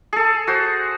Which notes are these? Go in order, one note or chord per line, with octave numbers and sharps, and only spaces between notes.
G#4 A4
F#4 C5